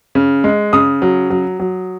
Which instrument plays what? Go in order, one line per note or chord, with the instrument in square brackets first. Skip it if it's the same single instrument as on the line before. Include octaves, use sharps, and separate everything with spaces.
[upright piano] C#3
G#3
C#3 D#6
F#3
F#3
F#3